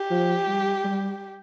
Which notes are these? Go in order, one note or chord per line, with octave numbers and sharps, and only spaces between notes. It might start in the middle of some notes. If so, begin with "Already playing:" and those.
Already playing: G4
F3
G3
G3